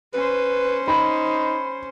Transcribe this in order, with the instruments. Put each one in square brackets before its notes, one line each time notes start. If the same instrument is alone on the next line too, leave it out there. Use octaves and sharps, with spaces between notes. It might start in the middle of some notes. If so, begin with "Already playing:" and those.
[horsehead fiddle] C#4 C5 [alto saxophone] B4
[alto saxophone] D#4 [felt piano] B5